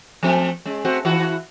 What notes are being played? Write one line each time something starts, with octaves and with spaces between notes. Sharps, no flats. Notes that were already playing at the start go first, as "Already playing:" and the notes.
F3 A3 C4
G#3 C#4
A3 C4 F#4
E3 E4 F#4